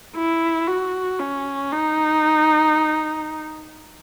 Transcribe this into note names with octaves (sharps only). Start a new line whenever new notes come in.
E4
F#4
C#4
D#4